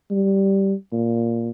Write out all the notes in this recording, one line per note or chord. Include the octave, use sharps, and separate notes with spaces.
G3
A#2